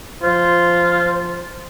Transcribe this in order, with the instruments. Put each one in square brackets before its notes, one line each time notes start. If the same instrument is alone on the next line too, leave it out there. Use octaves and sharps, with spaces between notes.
[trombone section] F3 C5 [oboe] F4